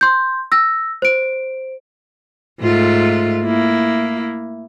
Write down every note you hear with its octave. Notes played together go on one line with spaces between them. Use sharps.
C6 G6
E6 A#6
C5 D7
G#2 A3 F4
A#3 E4